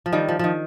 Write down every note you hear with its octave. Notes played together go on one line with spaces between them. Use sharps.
F3
D#3 G3
F3
D#3 F3